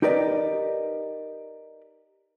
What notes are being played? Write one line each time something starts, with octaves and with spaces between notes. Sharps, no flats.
D#4 G4 A#4 B4 D5 D#5